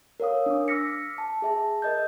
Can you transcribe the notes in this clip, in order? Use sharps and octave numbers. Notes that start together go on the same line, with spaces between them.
A#4 C#5 F5 D#6
D4 D6
D6 E6 F6 A#6 B6 C#7
A5
G#4 E5 A5
A#4 D#5 G6